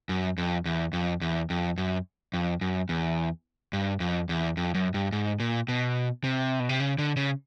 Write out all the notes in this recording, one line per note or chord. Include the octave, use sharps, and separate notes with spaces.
F#2
F2
E2
F2
E2
F2
F#2
F2
F#2
E2
G2
F2
E2
F2
F#2
G2
G#2
A#2
B2
C3
B2
C3
C#3
D3
C#3